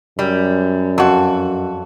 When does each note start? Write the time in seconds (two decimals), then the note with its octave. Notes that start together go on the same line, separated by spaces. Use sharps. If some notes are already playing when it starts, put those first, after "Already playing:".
0.19 F#2 G3
0.98 F2 F#4